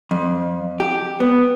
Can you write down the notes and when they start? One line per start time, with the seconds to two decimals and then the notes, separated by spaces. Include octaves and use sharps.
0.11 F2
0.80 G4
1.20 B3